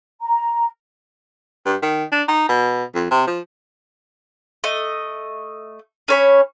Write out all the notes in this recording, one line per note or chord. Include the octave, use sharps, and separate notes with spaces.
A#5
G2
D#3
D4
D#4
B2
F2
C3
F3
A3 D#5
C#4 C#5 B5